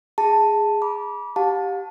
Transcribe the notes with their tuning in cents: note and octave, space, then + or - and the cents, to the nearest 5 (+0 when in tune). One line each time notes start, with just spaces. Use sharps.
G#4 -5 A5 +5
B5 -35 D6 -15
G4 +0 F5 +45 A5 +0